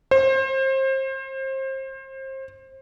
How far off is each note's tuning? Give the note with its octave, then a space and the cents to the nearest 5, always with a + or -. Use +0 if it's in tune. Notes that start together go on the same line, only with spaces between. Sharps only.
C5 +30